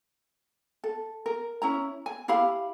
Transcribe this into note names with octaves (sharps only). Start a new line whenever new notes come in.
A4
A#4
C#4 E4 A#5
G#5
E4 G4 F5 B5